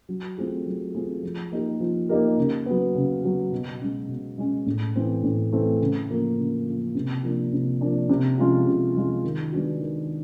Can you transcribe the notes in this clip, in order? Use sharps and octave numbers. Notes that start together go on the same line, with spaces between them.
F#3
A3 C4 F4 G#4
F#3
A3 C4 F4 G#4
F3
A#3 D#4 G4 A#4
F3
A#3 D#4 G4 A#4
C#3
F#3 B3
C#3
F#3 B3
B2
G#3 C#4
B2
G#3 C#4
A2
E3 A3 C4
A2
E3 A3 C4
C#3
F3 A#3
C#3
F3 A#3
C3
F3 A#3 D4
C3
F3 A#3 D4
C3
F3 G#3 C#4 F4
C3
F3 G#3 C#4 F4
D#3
G#3 B3 D4 F#4
D#3